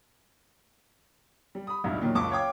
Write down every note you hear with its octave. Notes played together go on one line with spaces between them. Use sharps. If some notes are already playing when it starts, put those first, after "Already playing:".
G3
B5 D#6
E1 C#2 G2 D#4 E4
A#2 D#3 F#3
F#1 C#2 A5 C#6 D6
C#5 F5 G5 D6 G#6